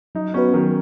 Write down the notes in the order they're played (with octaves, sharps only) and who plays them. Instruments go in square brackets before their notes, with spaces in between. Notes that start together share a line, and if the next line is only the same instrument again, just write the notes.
[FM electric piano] F#3 [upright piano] D#4
[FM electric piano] B3 F#4 B4 [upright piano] C#4
[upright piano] D#3 [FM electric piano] F#3